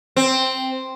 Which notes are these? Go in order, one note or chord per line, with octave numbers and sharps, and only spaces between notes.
C4